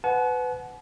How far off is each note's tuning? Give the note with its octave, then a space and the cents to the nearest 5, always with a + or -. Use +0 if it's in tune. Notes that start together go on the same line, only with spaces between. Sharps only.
B4 +25 F#5 +0 A5 -45